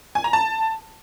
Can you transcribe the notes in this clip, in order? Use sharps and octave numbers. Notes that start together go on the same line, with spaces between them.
G#5
A#5
A5